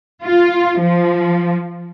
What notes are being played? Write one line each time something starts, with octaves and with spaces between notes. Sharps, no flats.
F4
F3